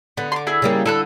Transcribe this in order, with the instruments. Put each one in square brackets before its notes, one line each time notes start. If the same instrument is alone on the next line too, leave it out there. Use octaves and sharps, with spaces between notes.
[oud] D3 [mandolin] B3
[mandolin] C6 D6
E4 G#4 E6
[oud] C#3 G3 A#3
[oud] D3 [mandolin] E4 A4 F#6